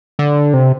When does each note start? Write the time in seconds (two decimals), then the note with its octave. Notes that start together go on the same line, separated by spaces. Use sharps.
0.19 D3
0.53 C3